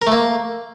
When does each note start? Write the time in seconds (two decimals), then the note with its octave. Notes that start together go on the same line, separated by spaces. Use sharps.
0.02 A#4
0.07 A3
0.12 A#3